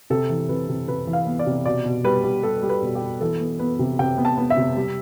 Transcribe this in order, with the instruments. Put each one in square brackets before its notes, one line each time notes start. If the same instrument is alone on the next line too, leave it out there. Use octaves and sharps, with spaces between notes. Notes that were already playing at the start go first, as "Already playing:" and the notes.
[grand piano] C3 A4
E3
C3 B4
C3
C3 B4
E3
F5
B3
D5
C3
B2 D5
B2
G3 B4
G3
G3 A4
G3
B4
B2
G4
B2
E3 A4
B3
B3 B4
C3
C3 G5
B3
A5
B3
E5
C3
G3